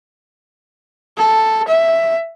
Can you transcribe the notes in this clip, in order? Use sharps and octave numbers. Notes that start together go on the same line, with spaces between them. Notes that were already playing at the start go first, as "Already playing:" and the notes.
A4
E5